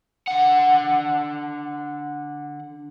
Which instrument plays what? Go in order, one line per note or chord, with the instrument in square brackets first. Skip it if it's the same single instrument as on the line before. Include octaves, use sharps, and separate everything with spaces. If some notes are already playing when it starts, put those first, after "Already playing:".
[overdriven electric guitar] D3 F#5